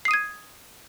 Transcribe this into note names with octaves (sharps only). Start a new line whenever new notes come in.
D#6 G#6 C7 D#7